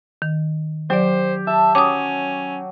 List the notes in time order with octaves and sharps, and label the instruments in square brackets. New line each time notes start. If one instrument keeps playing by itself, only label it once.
[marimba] D#3
[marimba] F#3 D5 [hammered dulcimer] G4 [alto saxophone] C5
[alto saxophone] E5 [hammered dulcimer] A5
[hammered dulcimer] F#3 [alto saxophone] C#4 [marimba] D6 D#6